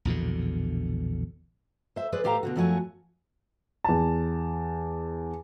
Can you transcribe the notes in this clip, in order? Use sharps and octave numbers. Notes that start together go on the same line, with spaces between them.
A#1 E2 B2 D3
C5 E5
G#4 B4 C5 D5
A2 G4 C5 F5 A5 A#5
B2 D3 F#4
F#2 F3 A3 F#4 C#5 G#5
E2 A5